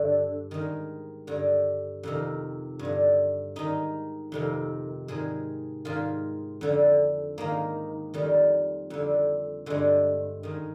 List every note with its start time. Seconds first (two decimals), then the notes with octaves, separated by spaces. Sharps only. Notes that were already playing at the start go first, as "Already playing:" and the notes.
Already playing: G2 D3 D4
0.51 G#2 D#3
1.27 G2 D3
2.03 F2 C3 D#3
2.79 G2
2.85 D3
3.56 G#2 D#3 D#4
4.32 F2 C3 D#3
5.08 G#2 D#3 G#4
5.85 G#2 D#3 F4
6.61 F2 D3
7.38 G#2 D#3 A#3
8.14 F2 D#3 G3
8.90 F2 D3
9.66 G2 D3 G#3
10.43 G#2 D#3